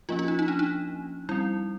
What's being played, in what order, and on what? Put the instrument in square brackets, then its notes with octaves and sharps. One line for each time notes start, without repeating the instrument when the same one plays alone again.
[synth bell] F3 A#3 C#4 F4
F4
D#4
D#4
D4
D#4
G3 C4 E4